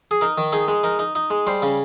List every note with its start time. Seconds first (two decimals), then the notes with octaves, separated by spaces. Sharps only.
0.11 G#4
0.21 D#4 A#4
0.38 D#3
0.52 D#4 G#4
0.68 G#3
0.84 D#4 A#4
0.99 D#4
1.15 D#4
1.30 G#3
1.47 G3 C5
1.62 C#3